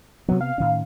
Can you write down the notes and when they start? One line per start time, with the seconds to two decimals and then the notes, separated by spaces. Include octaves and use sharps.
0.29 C3 F#3 B3
0.41 F5
0.58 A2 D#3 C#4